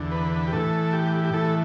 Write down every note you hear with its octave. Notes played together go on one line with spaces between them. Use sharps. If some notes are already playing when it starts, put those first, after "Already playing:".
Already playing: E2 D3
B4
G4
A2 E3 A4
G4
G4
A2 E3 A4